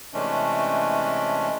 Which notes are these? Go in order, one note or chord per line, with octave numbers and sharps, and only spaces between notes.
C3 E3 G#3 A3 C#4 D4